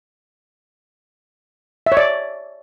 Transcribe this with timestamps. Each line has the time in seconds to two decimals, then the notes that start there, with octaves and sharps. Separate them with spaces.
1.86 E5
1.92 C#5
1.97 D5